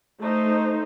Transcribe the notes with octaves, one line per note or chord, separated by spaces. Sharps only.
A3 D#4 C5